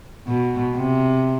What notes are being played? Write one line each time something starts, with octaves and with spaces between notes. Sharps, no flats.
B2
C3